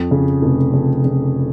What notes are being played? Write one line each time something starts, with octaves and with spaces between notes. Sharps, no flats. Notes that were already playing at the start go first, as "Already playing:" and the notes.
Already playing: F2
C#3
F1
C#3
C#3